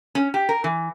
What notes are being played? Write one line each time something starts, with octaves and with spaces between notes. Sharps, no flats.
C#4
G4
A#4
E3